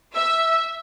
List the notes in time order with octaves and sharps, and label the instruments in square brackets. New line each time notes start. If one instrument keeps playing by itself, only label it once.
[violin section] E5 [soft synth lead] E6